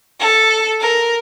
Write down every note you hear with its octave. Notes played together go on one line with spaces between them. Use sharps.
A4
A#4